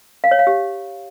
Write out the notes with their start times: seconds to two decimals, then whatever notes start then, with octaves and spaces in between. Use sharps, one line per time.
0.24 F5
0.31 C#5
0.39 F5
0.47 G4